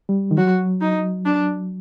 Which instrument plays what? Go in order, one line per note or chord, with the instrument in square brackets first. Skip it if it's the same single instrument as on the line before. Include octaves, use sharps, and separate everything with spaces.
[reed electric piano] G3
D#3
[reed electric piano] F#3 [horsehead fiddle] F#4
[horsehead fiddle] D#4
D4